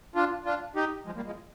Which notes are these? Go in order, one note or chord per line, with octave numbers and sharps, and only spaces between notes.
D4 F4
D4 F4
D#4 G4
F3 G#3
G3 A#3
F3 G#3